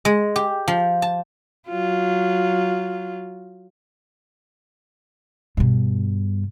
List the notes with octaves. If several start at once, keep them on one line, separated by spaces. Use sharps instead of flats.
G#3
G4
F3
A5
F#3 F4
G2 B2